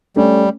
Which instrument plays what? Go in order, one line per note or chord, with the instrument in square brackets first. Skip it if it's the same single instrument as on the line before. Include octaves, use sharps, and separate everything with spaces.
[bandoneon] G3 [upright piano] A3 C#4